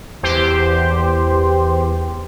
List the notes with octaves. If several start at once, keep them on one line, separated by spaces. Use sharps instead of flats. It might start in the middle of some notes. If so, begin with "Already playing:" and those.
E2 G4 C5